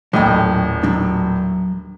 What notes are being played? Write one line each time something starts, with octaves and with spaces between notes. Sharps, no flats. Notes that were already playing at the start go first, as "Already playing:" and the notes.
D#1 A2 F#3 D#5 G5
F#3 D4